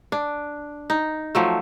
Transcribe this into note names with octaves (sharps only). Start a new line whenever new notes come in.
D4
D#4
F3 F#3 A3